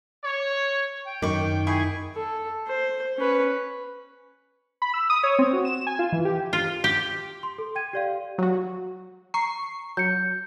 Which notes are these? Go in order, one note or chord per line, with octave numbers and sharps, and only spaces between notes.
C#5
G5
F#2 D#3 C#6 D6
E4 G#4 G#5 C#6
A4
C5
C#4 B4
B5
E6
D#6
C#5
C4
F#4
E7
G#5
F4
E3
G4
F4
G4
C6
A4
G5 G#6 D#7
G4 D5 F5
F#3 F#4
A#5 C#6 C7
F#3 G6 C#7